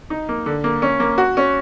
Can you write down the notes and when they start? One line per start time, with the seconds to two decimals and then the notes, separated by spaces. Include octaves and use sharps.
0.10 D#4
0.29 A#3
0.46 D3
0.64 A#3
0.82 C#4
1.00 A#3
1.18 F#4
1.37 C#4